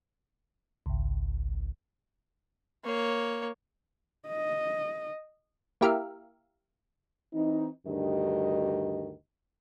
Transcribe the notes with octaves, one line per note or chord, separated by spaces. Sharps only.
G#1 C#2
A#3 C#5
D#5
A#3 E4 G4 A#4 E5 F5
E3 C4 D#4
D2 G2 D#3 G4 D#5